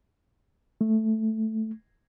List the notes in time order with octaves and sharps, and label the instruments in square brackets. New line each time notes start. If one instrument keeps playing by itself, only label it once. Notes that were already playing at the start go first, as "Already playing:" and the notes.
[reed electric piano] A3